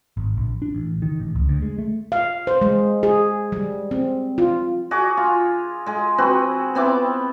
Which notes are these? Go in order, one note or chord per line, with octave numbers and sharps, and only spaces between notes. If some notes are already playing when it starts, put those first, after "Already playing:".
G#1
A#1
D4
A1
D#3
A1
C#2
D2
G#3
A3
F5
C5
G#3
G#4
G3
C4
F4
F#4 G#4 D6
F4
G#3 G#4
C4 F#4 B4
B3 C4 E4 D6